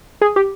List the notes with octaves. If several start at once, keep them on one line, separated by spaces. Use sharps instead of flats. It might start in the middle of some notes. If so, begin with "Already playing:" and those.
G#4
G4